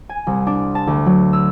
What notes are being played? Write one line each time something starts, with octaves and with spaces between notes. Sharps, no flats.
G#5
C2
D4
A5
D2
F#3
E6